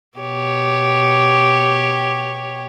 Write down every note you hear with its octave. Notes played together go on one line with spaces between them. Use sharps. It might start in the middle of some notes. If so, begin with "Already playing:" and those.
B2 G4 C#5